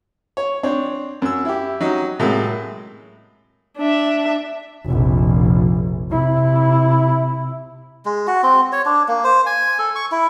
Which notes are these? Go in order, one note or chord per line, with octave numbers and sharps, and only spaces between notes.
C#5
C4 D4 C#5
F#2 E6
E4 G4
F#3 C#4 D#4
A2 C3 F#3 G#3 A#3
D4 E5
F1 A#1
C3 E4
G#3
F#4
C4
C#5
D4
A#3
C5
G#5
A4
C#6
E4